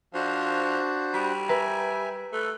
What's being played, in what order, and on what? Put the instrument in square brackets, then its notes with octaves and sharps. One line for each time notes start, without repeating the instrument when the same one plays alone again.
[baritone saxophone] F3 [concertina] D4 F#4 C5
[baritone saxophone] G3 [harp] B6
[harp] B4 A#5 [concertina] E5 G#5
[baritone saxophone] A3 [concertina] A4 B4